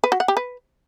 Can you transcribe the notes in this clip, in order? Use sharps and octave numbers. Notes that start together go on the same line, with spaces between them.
B4
F#4
F#5
G4
B4